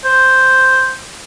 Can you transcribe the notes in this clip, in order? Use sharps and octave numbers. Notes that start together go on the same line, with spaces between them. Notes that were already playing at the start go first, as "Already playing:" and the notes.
C5